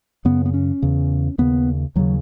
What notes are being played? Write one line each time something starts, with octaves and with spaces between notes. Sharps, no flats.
F#2 C#3 B3
B3
C#4
E2 C#3
D#2 C#3 B3
D#2 C#3 F#3